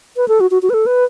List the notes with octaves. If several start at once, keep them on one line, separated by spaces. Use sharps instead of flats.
B4
A4
F#4
F#4
F#4
B4
A4
B4